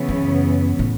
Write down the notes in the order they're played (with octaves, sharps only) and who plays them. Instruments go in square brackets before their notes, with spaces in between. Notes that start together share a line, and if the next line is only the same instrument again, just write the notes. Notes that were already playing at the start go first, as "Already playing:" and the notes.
Already playing: [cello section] C#3 E3 B3
[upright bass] F#2
A2